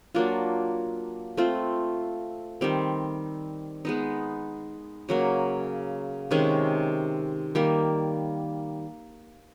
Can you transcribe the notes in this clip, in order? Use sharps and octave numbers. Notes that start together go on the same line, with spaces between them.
F#3 A#3 D4 F4
A3 C4 F4
D#3 G3 C4
G#3 B3 D#4
C#3 F#3 A#3
C3 D#3 G#3 C#4
D#3 G3 A#3